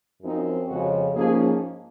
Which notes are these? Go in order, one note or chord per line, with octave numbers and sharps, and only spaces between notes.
F#2 F3 C4 D#4
F2 C#3 F3 G#3 F#4
G#2 F3 A#3 C#4 G#4